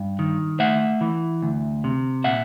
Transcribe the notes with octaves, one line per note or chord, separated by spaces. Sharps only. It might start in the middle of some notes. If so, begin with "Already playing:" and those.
Already playing: G2
D#3
A3 E5 F#5
E3
D2
C3
A#2 E5 F#5